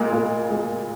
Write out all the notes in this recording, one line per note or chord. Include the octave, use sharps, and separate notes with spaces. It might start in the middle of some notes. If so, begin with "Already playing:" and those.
Already playing: A#2 G#3
A#2
G#3